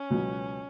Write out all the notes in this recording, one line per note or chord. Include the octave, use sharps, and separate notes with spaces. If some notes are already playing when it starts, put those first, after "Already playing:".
Already playing: C#4
C#2 B2 F#3 B3